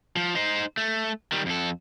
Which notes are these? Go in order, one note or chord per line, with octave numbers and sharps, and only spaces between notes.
F3
D#4 C5
A3
D#3 G3
F2 A4